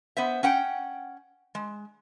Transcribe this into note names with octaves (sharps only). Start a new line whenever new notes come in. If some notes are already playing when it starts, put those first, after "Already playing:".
B3 C5 E5
C#4 F#5 G5
G#3